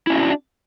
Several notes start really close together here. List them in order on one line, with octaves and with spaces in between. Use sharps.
E4 C#4 F#4 E5 D4